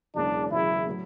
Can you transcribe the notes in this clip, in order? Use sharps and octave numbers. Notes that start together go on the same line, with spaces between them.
E1 E2 C#3 F#3 D4
E1 E2 C#3 F#3 E4
A2 F#3